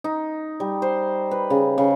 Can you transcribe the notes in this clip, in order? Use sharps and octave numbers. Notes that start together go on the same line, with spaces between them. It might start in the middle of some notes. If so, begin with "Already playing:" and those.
D#4
G3
C5
B4
C#3
C#3